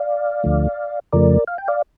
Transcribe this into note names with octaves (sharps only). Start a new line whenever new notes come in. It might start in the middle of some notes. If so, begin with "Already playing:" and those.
Already playing: D5 F5
D2 D3 F3 A3
F2 C#3 F3 A3 A#4 D5
F5
G5
D5 F5